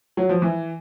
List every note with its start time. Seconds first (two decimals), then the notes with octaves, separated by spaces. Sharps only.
0.17 F#3
0.29 F3
0.42 E3